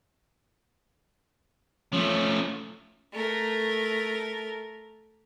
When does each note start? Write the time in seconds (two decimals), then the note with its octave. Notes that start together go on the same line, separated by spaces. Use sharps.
1.92 F3 A3 C#4
3.13 A3 A#4